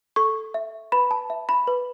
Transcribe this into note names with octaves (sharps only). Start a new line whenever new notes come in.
A4 C#6
E5
B4 B5
A5
E5
B5
B4